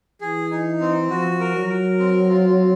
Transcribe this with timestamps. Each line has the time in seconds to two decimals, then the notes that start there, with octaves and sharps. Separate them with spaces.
0.21 E3 G#4
0.51 D#4
0.80 C4
1.10 F3 F#4
1.40 A#4
1.55 F#3
1.69 A#4
1.99 C4
2.29 F4
2.59 C4